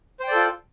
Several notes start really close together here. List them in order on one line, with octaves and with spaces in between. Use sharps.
C5 G5 D5 A4 F4